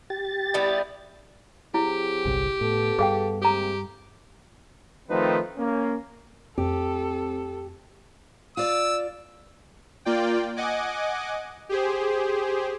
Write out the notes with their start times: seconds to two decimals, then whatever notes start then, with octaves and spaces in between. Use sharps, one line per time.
0.10 G4 A6
0.54 G3 B3 E4
1.74 F#3 C4 E4 G4 G#4
2.25 G1 C2
2.61 A2 B3 A4
2.99 G2 G#4 F5 G5
3.42 G#3 A#3 C4 G4 A4 A#5
5.09 D#3 F3 A3 C4 D#4 B4
5.57 A#3 C#4
6.58 F2 A3 C4 G4 A4
8.57 F4 D5 E6
10.05 A#3 F4 D5 G5
10.56 D#5 F#5 G#5 D6
11.69 G4 G#4 C5